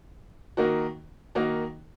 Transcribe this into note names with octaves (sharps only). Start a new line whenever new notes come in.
D#3 A#3 D#4 F#4
D#3 A#3 D#4 F#4